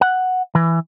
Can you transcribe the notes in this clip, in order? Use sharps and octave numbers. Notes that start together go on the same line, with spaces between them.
F#5
E3